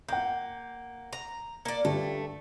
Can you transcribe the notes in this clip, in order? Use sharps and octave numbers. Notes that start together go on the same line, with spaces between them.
A#3 F#5 G6
A#5
A#3 D5 C#7
G2 D3 G3 A3